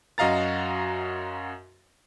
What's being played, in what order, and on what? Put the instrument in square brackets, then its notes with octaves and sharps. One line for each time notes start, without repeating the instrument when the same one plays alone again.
[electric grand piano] F#2 F#4 D#5 F5 A#5 A6